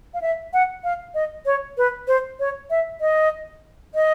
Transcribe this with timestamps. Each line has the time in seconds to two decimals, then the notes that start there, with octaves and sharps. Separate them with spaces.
0.14 F5
0.22 E5
0.53 F#5
0.84 F5
1.14 D#5
1.46 C#5
1.78 B4
2.08 C5
2.40 C#5
2.70 E5
3.01 D#5
3.95 D#5